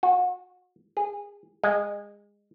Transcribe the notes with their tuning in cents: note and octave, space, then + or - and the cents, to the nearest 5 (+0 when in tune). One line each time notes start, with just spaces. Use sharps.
F#4 -30
G#4 -25
G#3 -25